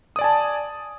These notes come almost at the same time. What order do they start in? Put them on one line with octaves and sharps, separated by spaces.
D#6 D5 G#5 A5